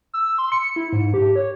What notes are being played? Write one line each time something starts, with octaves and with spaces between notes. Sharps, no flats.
E6
C6
C#7
E4
G#2
G4
C#5